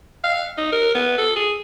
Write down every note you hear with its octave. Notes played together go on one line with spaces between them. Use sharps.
F5
D#4
A#4
B3
A4
G#4